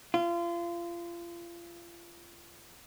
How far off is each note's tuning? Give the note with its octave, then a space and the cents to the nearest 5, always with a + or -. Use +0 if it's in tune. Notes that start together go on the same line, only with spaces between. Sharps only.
F4 -30